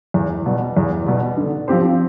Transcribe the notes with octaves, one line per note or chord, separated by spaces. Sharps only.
E2
B2 G3
E2
B2 G3
D3
F3 C4 G4 C5